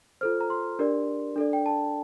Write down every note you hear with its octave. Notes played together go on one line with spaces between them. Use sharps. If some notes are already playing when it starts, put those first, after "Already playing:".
F4 A4 C5 F6
A#5
C6
D4 G4 A#4 D5
D4 A4 D5
G5
A5